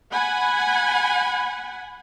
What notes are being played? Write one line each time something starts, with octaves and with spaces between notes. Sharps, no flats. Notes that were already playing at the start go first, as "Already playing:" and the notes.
F#5 G#5 B5